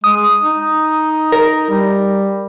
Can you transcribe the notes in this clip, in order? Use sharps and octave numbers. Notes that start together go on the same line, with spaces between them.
G#3 D#6
D#4
A#4
G3